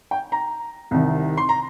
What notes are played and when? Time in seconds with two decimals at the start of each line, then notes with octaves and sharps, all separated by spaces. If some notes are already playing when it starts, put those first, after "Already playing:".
0.11 G5
0.32 A#5
0.91 C2 C3 D#3
1.37 C6
1.49 A#5